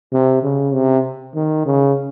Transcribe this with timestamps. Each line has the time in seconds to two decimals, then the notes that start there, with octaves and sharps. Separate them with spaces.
0.12 C3
0.43 C#3
0.73 C3
1.35 D#3
1.65 C#3